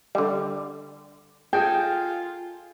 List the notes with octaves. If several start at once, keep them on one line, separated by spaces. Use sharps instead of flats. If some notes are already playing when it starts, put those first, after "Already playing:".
D3 G3
F4 G#4 A4 D#5 G5